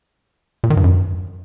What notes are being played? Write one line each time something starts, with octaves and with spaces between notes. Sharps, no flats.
A#2
D#3
G2
F#2